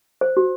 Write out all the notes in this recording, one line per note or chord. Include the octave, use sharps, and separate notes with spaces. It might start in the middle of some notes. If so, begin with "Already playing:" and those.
C5
F#4